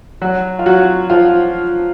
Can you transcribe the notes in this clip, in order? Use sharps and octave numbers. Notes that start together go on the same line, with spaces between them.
F#3 F#4
F4
F#3 F#4
F3 F4